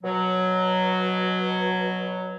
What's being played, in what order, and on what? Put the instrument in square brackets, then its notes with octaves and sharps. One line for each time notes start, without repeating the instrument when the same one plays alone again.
[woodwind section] B2 F#3